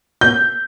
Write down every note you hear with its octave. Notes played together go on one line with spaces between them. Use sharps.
G6